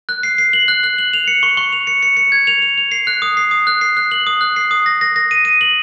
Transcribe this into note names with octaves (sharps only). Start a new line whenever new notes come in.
F#6
C7
C7
F#7
F#6
F#6
F#7
F7
C#7
C#6
C#6
F7
C#7
C#7
C#7
G#6
F7
F7
F7
C7
F#6
D#6
C7
D#6
F#6
C7
F#6
F#7
D#6
F#6
C7
D#6
A#6
A#6
A#6
D#7
D#7
F#7